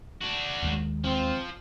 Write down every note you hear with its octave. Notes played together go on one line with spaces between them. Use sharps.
D4 F#4
D#2 D#3 G#3
F3 C4